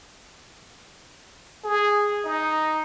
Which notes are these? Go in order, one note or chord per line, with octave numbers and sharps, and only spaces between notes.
G#4
D#4